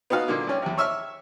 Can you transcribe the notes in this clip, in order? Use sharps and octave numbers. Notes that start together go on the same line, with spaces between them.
B3 D#4 F#4 F5
A#2 D3 A#3
C2 C#4
E2 C3
C#5 E5 E6 F6